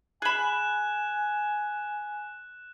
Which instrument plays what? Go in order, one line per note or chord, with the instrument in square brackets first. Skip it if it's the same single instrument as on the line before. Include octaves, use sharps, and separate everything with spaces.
[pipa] G#4 B5 [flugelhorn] G#5 [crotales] F#6 E7